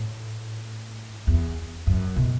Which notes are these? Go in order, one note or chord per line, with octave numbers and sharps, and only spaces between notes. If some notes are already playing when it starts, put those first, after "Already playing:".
Already playing: A2
E2
F#2
B2